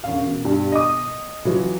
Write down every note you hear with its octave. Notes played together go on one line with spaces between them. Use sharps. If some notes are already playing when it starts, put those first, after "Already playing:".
E1 C#4 F5
B2
G2
D#5 D#6
E3 F#3 F4